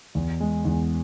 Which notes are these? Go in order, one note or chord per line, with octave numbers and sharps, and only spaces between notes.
E2
G#3
E2